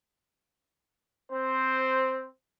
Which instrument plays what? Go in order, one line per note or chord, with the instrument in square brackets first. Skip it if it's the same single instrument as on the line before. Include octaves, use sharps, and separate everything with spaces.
[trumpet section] C4 C5